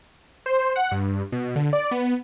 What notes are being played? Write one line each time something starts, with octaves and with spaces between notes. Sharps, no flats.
C5
F#5
G2
B2
D3
D5
B3